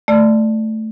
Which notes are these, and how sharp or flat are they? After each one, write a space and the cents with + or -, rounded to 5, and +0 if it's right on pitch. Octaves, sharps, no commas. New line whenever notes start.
A3 +0 D5 +10 E6 +45